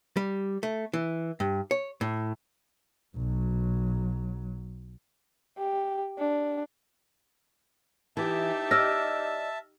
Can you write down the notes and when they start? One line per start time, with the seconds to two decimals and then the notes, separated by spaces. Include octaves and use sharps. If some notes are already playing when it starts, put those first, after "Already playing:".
0.17 G3
0.63 A3
0.94 E3
1.40 G2
1.71 C#5
2.01 A2
3.17 B1 F#3
5.58 G4
6.18 D4
8.17 E3 D#4 G4 E5 A5
8.71 D5 D#5 E6 F6 A#6